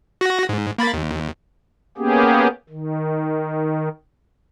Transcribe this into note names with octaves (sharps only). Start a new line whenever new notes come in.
F#4 A#6
G#2
A#3 B5 A6
D#2
A#3 B3 C#4 G4 G#4
D#3